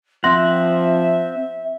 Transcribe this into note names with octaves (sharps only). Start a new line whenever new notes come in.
F3 C4 E5 F#5 C6 A#6